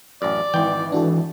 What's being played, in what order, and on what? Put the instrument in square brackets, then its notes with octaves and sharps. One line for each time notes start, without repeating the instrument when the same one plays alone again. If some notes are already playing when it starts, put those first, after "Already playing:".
[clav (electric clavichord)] A1 F#2 [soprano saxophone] D5
[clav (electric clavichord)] G#1 G5 [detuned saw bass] E3
[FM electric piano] D4 F#4 A4